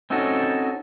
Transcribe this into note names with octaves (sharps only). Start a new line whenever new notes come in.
C4 C#4 D#4 F#4 A4